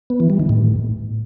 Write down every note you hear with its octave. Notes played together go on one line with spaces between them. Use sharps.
B3
E3
G3
D#3
A2